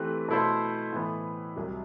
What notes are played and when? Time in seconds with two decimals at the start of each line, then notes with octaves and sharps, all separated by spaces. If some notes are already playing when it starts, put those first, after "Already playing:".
Already playing: E3 A3 C4 G4 B4
0.29 B2 A3 E4 A4 C5
0.93 A2 E3 B3
1.56 C2 C3 F#3